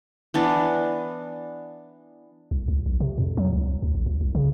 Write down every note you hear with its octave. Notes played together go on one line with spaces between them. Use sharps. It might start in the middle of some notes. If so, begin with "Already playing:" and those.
E3 B3 D4
C2
C#2
B1
C3
F2
F#3
C#2
D2
A#1
C#2
C2
C#3